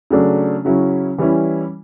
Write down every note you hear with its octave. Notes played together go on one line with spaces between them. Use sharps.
C#3 F#3 A3 D4
C#3 F#3 C#4 E4
E3 G3 C#4 E4